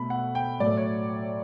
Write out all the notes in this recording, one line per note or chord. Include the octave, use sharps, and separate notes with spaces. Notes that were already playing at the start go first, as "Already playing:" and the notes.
Already playing: B2 A3 B5
F#5
G5
A2 F#3 A3 D5
C#5